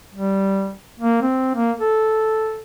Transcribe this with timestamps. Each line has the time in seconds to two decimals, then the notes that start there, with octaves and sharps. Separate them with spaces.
0.14 G3
1.00 A#3
1.22 C4
1.55 A#3
1.80 A4